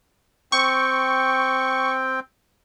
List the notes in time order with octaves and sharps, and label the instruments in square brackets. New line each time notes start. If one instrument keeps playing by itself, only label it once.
[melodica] C4 G5 [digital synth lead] C#6